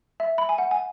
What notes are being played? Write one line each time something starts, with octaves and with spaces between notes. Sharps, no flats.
E5
B5
G#5
F#5
G#5